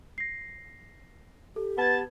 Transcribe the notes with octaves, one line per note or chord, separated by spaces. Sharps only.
A#6 C7
G4 A4
B3 B4 A5 G#6